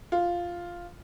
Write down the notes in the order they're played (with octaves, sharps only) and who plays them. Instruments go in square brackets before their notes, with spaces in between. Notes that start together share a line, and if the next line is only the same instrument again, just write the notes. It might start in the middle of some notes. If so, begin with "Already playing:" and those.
[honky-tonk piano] F4